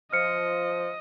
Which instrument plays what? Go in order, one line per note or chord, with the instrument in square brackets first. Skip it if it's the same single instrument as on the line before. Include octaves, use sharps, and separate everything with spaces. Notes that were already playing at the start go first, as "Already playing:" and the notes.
[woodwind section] F3 [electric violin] D#5 [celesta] F6 C#7